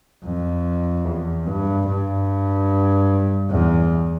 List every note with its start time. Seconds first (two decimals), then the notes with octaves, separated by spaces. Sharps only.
0.24 F2
1.05 E2
1.47 G2
1.87 G2
3.50 E2